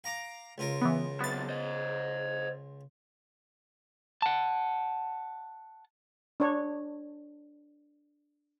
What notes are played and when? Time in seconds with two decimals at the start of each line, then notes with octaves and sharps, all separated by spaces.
0.04 F5 A#5 D6
0.58 C#2 F4 A#4
0.82 E3 B3
1.20 C3 F#3 B3 A6
1.49 C5 D#5
4.22 F#5 A5
6.40 D4 C#5